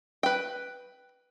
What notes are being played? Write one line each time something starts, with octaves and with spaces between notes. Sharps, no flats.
B4 G5